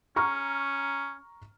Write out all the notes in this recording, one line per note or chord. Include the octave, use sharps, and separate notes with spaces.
C#4 A#5 C#6 F6